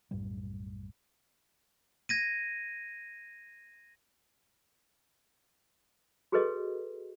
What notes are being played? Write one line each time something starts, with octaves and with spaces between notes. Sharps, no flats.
B1 F#2 A2 G3
G#6 A#6 D#7
F#4 G#4 A4 B4 C#5 D#5